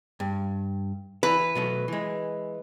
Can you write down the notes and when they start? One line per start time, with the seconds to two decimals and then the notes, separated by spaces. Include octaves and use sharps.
0.20 G2
1.23 E3 E4 B4
1.55 B2 F#3 A3
1.88 E3 G#3